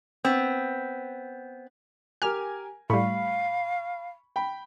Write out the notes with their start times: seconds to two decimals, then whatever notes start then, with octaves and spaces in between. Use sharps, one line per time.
0.25 B3 C4
2.22 G4 A#4 G#5 F6
2.90 A2 G3 F5 B5 C#6
4.36 G5 B5